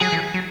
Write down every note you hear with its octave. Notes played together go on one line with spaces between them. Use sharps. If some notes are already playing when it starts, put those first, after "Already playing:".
F#3 G#4
E3
F#3